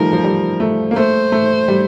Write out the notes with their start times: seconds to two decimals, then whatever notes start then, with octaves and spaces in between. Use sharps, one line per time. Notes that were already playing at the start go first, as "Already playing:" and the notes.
Already playing: D#3 F3 G3 A3 A#4
0.13 F3
0.24 G3
0.60 A3
0.91 A#3
0.96 A3 C5
1.32 A3
1.68 G3